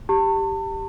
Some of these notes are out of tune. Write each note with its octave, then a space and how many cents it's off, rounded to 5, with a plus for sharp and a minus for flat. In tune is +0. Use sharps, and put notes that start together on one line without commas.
G4 +0 A5 +35